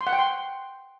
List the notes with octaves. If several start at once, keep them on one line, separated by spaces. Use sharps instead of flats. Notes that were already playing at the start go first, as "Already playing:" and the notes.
C6
F#5
G5
C6